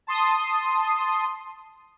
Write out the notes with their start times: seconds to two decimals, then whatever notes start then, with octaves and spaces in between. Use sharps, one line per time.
0.07 A5 C6 D#6